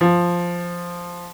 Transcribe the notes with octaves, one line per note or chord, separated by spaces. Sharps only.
F3